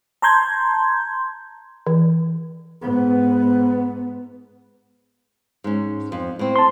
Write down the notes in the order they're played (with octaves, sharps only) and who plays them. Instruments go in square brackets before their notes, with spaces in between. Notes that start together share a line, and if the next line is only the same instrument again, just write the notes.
[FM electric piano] A5 A#5 C6 G6 G#6
[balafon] E3
[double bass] G#2 B3
[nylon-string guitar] G#2 C#4
F2
A2 C4
[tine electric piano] A5 C6